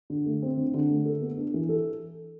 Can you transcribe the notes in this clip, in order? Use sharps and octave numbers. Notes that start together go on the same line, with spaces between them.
D3
A3
C4
D3
D3
A3
A4
B3
D4
E3
A4